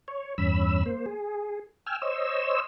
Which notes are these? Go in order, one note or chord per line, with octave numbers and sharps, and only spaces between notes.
C#5
E2 G2 C#4 B5 E6
A#3 C5
G#4
G5 G#5 E6 F6
C5 C#5 D#5 E6